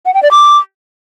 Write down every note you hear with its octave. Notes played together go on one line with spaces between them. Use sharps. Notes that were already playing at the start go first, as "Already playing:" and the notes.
F#5
G5
D5
D6